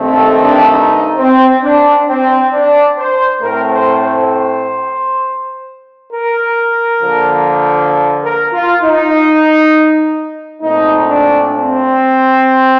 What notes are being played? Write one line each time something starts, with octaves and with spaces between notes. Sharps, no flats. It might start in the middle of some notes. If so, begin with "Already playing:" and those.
Already playing: G2 D#3 A3 C4
A4
D4
D#4
C4
D4
C4
D4
C5
A2 A3 C4 A#4
C5
C5
A#4
D3 F3 A#3
A#4
F4
D#4
A#2 A3 C4 D#4
D4
C4